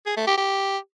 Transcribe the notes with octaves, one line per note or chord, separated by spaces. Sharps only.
G#4
A3
G4
G4